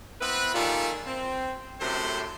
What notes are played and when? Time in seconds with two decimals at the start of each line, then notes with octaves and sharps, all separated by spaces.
0.21 B3 C4 E4 B4
0.54 A#2 D#3 G3 F4 G#4 A4
1.07 C4
1.81 F#2 A2 C3 A3 D4 C5